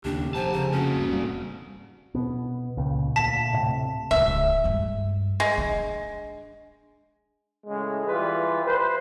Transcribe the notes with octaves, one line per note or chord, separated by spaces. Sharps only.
D#2 A#2 C#3 D4 G4
F1 C5 G#5 A5
C#3 C5
A#3 C#4 F#4
E1 G2
E1 G#2 C3 G3
B2 B3
C#2 A#2 C#3
D2 A#2 A5 B6
A2 C3
D1 C#2 E5
G2 G#3
G#3
D4
A2 C#3 G#3
E3 G3 F4 B4
B4 C5